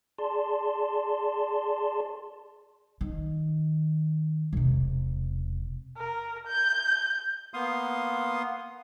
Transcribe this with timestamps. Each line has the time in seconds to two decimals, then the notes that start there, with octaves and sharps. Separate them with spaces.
0.18 G#4 D5 A5 C6
3.01 D#3
4.53 E1 C3
5.97 A#4
6.47 G6
7.54 A#3 B3 F5 C6 D#6